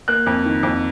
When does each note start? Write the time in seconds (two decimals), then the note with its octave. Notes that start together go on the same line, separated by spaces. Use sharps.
0.08 A#3 F#6
0.26 F2
0.45 D#3
0.63 F2